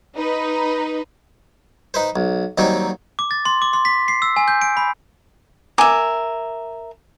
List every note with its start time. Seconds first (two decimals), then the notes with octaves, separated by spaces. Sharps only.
0.15 D#4 B4
1.94 D#4 B4 C5
2.16 B1
2.58 D#2 F#3 G3 C4 D#4
3.19 D6
3.31 A6
3.45 C6
3.62 D6
3.73 C6
3.85 B6
4.08 C7
4.22 E6
4.36 G#5
4.48 G6
4.62 D7
4.77 B5
5.78 A#4 E5 G#5 D6